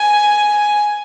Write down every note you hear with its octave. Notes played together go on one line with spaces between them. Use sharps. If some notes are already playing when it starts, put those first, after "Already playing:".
Already playing: G#5